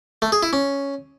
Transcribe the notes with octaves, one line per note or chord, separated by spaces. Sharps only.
A3
G#4
E4
C#4